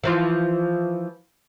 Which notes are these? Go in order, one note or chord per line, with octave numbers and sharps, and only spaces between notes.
E3 F3 F4